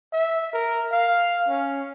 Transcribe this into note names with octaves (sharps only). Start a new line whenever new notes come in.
E5
A#4
F5
C#4